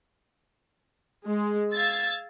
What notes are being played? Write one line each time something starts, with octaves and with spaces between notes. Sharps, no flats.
G#3
F5 E6 G#6 A6